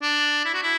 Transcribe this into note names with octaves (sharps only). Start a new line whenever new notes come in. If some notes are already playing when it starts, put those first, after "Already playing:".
D4
E4
F#4
E4